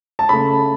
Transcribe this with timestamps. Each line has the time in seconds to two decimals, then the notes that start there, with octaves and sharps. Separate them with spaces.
0.19 A5
0.29 C#3 A3 B5